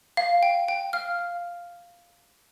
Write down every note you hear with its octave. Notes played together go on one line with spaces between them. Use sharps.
F5
G5
G5
F5 F6
F5